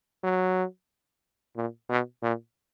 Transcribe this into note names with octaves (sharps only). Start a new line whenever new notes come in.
F#3
A#2
B2
A#2